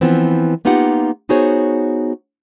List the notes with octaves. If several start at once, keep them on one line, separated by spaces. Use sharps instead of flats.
E3 F3 B3 C4
A#3 B3 D#4 F4 G4 F#5
B3 D#4 F#4 G#4 C5 C#5